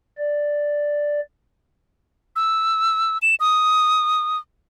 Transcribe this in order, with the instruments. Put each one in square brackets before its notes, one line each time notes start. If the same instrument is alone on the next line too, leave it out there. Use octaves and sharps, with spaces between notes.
[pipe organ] D5
[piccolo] E6
E7
D#6